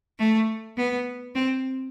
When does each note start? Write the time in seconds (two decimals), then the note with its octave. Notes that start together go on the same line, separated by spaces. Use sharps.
0.19 A3
0.77 B3
1.35 C4